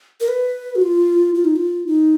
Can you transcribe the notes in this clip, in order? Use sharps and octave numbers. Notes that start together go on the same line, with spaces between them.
A#4
B4
F#4
F4
F4
D#4
F4
D#4